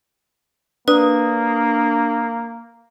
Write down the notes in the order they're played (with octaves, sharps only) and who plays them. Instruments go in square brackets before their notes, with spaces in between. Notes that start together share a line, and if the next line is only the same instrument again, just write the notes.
[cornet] A#3 [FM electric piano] D4 D#6 [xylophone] B4